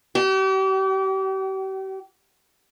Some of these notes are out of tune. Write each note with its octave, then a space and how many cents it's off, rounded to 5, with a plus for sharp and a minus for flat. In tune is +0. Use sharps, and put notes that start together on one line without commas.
G4 -40